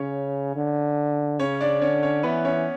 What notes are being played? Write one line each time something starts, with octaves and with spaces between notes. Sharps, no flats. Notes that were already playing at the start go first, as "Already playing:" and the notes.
Already playing: C#3 C#4 C#5
D3
C#3 C#4 C#5
D4 D5
D3 C#4 C#5
C#4 C#5
E3 B3 B4
C#4 C#5